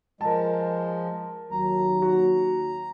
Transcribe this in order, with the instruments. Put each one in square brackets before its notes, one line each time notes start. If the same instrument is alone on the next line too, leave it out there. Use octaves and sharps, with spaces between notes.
[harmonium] F3 G#3 [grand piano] A#4 A5
[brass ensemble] D#2 F#3 [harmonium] A#5
[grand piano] F#4